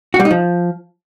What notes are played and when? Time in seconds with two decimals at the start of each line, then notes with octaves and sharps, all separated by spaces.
0.14 F#4
0.20 G3
0.25 D#4
0.31 F3